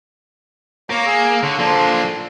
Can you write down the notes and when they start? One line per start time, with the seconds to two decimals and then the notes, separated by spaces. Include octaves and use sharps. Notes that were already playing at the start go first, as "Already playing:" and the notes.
0.90 A#3 C#5 A#5 D6
1.06 G#4 E6
1.43 D3 C#5
1.58 F3 A#3 D4 A4 C6